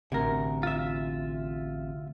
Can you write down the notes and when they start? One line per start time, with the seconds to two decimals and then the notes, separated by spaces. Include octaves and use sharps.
0.12 A1 D2 C3 A#4
0.63 F4 E5